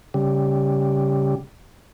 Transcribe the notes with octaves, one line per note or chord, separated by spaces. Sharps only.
C#3 G3